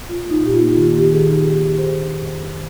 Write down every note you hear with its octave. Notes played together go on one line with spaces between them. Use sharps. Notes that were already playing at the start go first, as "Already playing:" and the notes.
A#2 F4
A#3
D#4
A#2 G4
F4
A#3
D#3
A#3
G4
D#4 G#4
G4
D#4
G#2 G#4
A#3
A#3 C5
D4
F2
F2